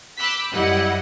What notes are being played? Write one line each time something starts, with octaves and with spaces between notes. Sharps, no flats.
B5 D6 E6 F#6 G6 B6
F#2 G3 E4 D#5 F#5